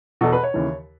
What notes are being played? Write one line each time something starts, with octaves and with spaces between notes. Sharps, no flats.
E2 B2 A4
B4
C#5
D#2 C#3 E3